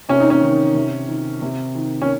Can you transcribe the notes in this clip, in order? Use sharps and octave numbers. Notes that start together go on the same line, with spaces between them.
C3 C#4
D#4
C#4
D#3
C3
D#3
C3
D#3
C#4